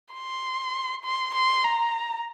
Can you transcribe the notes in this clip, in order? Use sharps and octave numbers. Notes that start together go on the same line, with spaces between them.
C6
C6
C6
A#5